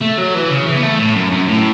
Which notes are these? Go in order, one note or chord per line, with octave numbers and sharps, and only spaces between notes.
A3
F#3
E3
C#3
E3
B3
A3
A2
F#2
F#2
A2